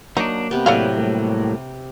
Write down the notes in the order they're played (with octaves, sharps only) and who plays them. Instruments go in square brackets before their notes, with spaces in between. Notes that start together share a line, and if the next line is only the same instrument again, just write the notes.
[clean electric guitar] F#3 D4 [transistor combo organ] A#3 [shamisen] D#4
[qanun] C3 B3
[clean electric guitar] A2 F#3 [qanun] C3 B4 [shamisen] A4 D5 F5
[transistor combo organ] G3 A3 A#3